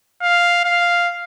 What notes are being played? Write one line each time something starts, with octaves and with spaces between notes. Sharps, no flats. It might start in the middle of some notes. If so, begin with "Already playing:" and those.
F5
F5